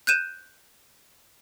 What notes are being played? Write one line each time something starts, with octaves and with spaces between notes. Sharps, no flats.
F#6 G6 D#7 E7